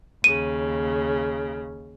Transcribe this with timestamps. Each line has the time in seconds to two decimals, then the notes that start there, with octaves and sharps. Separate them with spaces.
0.24 D#2 C#3 D#7